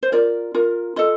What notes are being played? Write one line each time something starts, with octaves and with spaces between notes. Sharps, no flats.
C5
F4 A#4 D5
F4 A#4
F4 A4 D#5